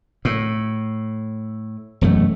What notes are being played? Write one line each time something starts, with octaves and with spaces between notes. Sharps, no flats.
A2
E1 F#2 A3